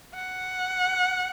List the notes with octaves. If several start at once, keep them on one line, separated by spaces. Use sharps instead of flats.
F#5